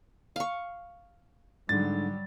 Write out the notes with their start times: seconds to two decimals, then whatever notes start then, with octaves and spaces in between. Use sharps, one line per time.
0.36 F5 C#6
1.69 G#2 D3 F#3 G3 A6